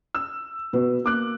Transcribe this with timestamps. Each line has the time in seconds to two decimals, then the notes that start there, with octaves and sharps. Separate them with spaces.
0.15 E6
0.73 B2 F#4 B4
1.04 A#3 D6 F#6